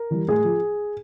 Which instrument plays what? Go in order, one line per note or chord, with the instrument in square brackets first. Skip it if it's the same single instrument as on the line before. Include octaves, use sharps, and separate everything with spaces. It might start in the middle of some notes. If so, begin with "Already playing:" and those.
Already playing: [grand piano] A#4
E3 G3
A2 G#4
F3